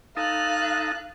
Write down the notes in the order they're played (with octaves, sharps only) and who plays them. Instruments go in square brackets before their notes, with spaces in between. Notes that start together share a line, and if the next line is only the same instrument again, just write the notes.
[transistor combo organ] D#4 A4 [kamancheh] F5 F#6